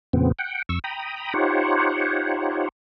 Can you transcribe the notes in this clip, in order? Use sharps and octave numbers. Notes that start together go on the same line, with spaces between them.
F2 A#2 C#3 B3 C4
F#5 G5
F2 C#6 E6
G5 A#5 B5 D#6
D#4 F4 G4 C5 C#5 F#5